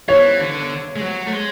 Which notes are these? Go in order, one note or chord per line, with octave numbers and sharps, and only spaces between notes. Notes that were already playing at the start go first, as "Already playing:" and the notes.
E3 C#5
D3
G#3
F#3
A3
G#3